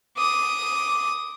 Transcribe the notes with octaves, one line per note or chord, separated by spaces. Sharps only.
D6 D#6